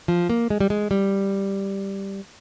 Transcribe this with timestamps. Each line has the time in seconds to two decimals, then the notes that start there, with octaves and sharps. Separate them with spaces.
0.08 F3
0.30 A#3
0.50 G#3
0.60 G3
0.70 G#3
0.91 G3